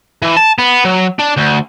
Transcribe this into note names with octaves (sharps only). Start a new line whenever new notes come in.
E3
A5
B3
F#3
D4
D2